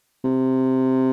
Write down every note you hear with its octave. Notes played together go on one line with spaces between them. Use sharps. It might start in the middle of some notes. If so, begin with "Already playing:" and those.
C3